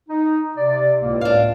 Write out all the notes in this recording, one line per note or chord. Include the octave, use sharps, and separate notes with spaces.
D#4
C3 D5
C#2 A2 A#3
D4 F5